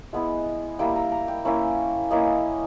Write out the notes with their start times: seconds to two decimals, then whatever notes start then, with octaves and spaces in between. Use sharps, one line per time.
0.13 G#3 B3 E4 E5
0.79 G3 A#3 E4 G5
0.96 A#5
1.12 A#5
1.28 G5
1.45 A#3 C#4 E4 E5
2.11 A#3 C#4 E4 D#5